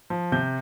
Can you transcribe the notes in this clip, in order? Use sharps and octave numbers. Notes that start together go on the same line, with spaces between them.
F3
C3 G6